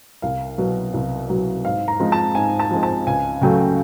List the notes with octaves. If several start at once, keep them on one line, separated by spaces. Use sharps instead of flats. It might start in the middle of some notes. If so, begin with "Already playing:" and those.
C2 F5
B2 F#3
C2
B2 F#3
G#2 F5
A#5
F3 G#3 C4
A5
G#2 G#5
A5
F3 G#3 C4
A5
C#2 G#5
C#3 F#3 A3 G5